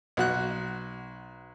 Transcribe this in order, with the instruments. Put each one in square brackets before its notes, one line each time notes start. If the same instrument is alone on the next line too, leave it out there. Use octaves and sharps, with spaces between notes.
[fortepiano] B1 F#4 F#6